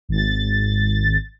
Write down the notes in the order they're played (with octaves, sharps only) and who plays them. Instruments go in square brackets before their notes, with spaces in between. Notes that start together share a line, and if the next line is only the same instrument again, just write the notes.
[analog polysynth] G#1 A6